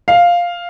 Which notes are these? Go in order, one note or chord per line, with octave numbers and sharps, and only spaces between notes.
F5